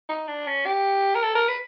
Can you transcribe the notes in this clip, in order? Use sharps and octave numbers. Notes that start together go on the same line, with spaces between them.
D#4
D4
C#4
G4
A#4
A4
A#4
B4